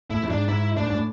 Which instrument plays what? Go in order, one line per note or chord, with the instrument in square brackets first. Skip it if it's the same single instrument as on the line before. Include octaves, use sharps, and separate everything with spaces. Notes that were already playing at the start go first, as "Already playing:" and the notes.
[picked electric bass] A2 [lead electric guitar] E4
[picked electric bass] F2
[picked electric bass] G#2 [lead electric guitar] D4
[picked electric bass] G#2 [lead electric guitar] E4
[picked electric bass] A2 [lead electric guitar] D4
[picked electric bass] G#2
A2